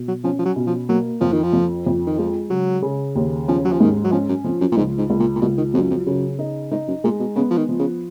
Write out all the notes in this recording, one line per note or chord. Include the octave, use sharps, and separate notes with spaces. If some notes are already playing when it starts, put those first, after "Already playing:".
Already playing: B2
F#3
F3 C#4
F3
F#3
B2
F3
F#3 A#3
F2 F3
D#3
F3
F2
F2
D#3
F3 G#3
C#3 F#3
C#3
D#2
F3 C#4
F#3
F3
G#2 D#3
F#3
F3 C#4
F#2
F2 F3
F#2
A#2
C#2 G#2
G#2
C#2
A#2
A#2
C#2 B2
D#3
F2 F#3
F#2
F2
F#2 C#3
D#4
G#2 D#4
F#2
A#2 G#3
B2
C#3 B3
F3
D#3
F3
C#3